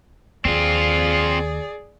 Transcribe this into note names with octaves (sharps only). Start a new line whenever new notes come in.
D#2 C4 F4 G#4 D5